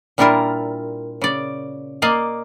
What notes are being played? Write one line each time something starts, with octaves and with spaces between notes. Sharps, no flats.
A#2 G3 D4 E4 F4 A#4
C#3 D5
A#3 D5 D#5 F5